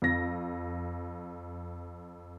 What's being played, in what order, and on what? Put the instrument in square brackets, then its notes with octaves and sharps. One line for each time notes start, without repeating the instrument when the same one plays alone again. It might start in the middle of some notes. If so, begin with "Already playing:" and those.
[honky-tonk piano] F2 A#6